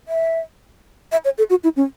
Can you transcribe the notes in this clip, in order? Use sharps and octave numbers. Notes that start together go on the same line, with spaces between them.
E5
E5
C#5
A4
F#4
E4
C#4